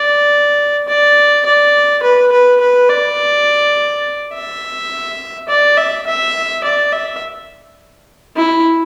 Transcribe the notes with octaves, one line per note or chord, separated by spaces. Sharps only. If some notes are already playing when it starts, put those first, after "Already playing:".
Already playing: D5
D5
D5
B4
B4
B4
D5
E5
D5
E5
E5
D5
E5
E4